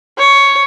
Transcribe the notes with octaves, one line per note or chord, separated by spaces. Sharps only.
C#5